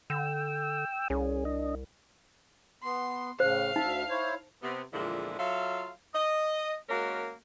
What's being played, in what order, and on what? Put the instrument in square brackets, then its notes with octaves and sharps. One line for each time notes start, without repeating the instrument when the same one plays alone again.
[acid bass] D3 [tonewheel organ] G5 E6
[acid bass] C2 [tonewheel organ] C#4 G#4
[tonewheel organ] D4 D#5
[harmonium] B3 [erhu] C6
[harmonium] A2 C#3 [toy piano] C5 [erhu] F5
[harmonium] D2 E5 [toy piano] D#4
[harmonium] E4 C5 C#5
[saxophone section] C3 B3
E2 A#2 D3 F3 G#3 E4
F#3 F4 A4 E5 F5
D#5
G#3 A#3 C#4 F#4 A#4